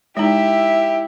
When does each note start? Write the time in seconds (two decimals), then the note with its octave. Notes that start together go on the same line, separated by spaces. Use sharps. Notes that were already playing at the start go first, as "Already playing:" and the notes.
0.17 G#3 D#4 E4 G4 E5